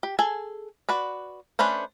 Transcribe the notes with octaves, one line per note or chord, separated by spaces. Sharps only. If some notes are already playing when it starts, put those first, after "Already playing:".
G4
G#4 A4 G#5
F#4 B4 D5
A3 C#4 D4 B4 C5